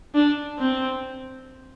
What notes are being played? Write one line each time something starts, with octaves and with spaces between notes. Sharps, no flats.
D4
C4